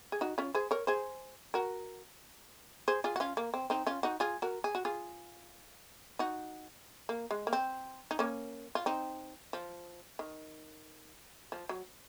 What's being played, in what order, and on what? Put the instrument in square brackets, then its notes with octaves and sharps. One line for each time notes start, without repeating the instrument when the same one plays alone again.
[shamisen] G#4
D#4 F#4
C#4 F4
G#4 C5
A#4 C#5
G#4 C5
F#4 A#4
G#4 C5
F4 G#4
F#4
C#4 F4
A#3
C4
C4 D#4
C#4 F4
D#4 F#4
F4 G#4
F#4 A#4
G#4
F#4
F4 G#4
D#4 F#4
A#3
G#3
A#3
C4
D#4
A#3 C#4
F4
C4 D#4
F3
D#3
F3
F#3